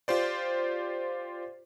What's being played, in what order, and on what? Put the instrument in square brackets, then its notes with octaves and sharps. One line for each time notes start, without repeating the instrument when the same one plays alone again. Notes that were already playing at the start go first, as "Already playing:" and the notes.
[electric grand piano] F4 G4 C5 D5